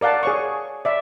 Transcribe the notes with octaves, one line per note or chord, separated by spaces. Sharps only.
A#4 D5 F5 F#5 A5
G#4 C#5 C#6
D5 E5